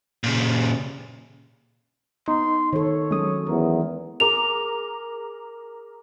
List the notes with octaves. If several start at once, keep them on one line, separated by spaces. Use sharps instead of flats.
A#2 C#3
B3 D#4 C6
D#3 A4 C#5
F#3 G#3 C#4 A4 D#6
E2 A#4
G#4 A#4 D6 F7